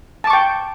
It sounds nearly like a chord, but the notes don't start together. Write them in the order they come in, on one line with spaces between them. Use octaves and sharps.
A5 D6 C#6 G5